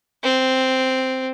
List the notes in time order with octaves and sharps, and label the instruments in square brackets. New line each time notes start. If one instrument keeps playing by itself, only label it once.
[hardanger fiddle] C4